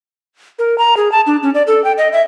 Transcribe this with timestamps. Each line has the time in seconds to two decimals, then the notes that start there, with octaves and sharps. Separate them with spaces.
0.59 A#4
0.78 A#5
0.97 G#4
1.12 A5
1.27 D4
1.43 C#4
1.54 D5
1.67 A4
1.84 G5
1.98 D#5
2.13 E5